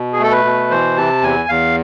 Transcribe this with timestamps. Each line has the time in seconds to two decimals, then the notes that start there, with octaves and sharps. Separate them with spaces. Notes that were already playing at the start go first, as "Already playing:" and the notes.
Already playing: B2
0.13 G#4
0.20 A3 A4
0.32 B4
0.45 B2
0.71 E3 C5
0.97 C3 A5
1.22 E2 G#5
1.49 E2 F5